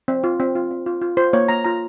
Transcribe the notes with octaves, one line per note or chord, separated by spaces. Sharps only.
C4
F4
C4
F4
C4
F4
F4
F4 C5
A#3 C#5
A#3 A#5
F4 A#5